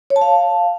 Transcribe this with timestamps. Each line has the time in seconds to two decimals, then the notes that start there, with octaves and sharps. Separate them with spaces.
0.10 C#5
0.16 A5
0.21 F5